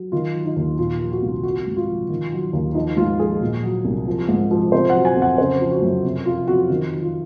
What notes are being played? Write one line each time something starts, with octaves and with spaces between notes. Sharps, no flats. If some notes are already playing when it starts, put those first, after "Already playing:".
Already playing: F#3
D#3 F4
F#3
D#4
D#2
A#2 F4
F3
F#4
C2
F3 F#4
G#2
F4
F3
D#3
F#3
D#2
F3 D#4
G#2 F4
F3 G#4
A#2
F#3
C2
F3
G#2
F3
C3 C5
F#3 F#5
G#5
F2
F#5
C#3 C5
F3
F#4
F#2
C3
F3 F4
F2 F#4
D#3
F#3
F4